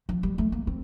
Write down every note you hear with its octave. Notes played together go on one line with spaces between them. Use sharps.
F3
G3
A3
A#3
C4